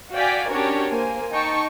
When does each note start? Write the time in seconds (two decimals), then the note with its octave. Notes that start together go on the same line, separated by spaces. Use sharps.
0.14 F#4 D5 F5 G5 G#5 B6
0.50 C#4 D4 F#4 G4 A#4 C#5
0.89 A#3 C5 G#5
1.33 D#4 G5 A5 C#6